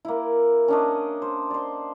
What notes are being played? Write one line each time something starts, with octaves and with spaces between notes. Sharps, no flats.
A#3 E4
C#4 D4 D#5
C5
C5 D5